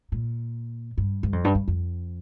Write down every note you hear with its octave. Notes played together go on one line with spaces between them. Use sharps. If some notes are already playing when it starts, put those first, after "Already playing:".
A#2
G2
G2
F2
G2
G2
F2